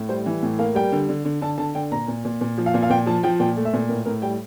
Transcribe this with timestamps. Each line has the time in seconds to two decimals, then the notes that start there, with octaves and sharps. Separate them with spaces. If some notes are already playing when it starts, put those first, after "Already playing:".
Already playing: A2
0.09 G3 C5
0.26 E3
0.43 A2
0.59 A#3 F5
0.75 G3 G5
0.92 D3
1.09 D3
1.25 D3
1.41 D3 A5
1.58 D3 A5
1.75 D3 G5
1.92 A#2 A#5
2.08 A#2
2.25 A#2
2.41 A#2
2.58 F3
2.66 F5
2.74 A#2
2.83 F5
2.90 A#2 G5
3.06 F3 A5
3.23 F3 G5
3.40 A#2 G5
3.57 A3
3.65 E5
3.73 A#2
3.89 A2 A#4
4.06 A2 A#4
4.22 G3 G5